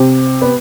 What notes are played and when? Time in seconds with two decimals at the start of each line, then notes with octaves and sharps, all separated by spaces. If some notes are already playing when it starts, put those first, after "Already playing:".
Already playing: C3 C4
0.41 B3